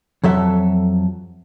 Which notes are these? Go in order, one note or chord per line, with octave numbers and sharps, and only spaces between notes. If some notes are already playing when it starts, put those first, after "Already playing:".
F2 F#3 A4 E5